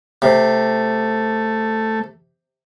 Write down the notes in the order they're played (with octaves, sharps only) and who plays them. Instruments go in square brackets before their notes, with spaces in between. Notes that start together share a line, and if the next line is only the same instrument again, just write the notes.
[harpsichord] C3 [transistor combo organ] A3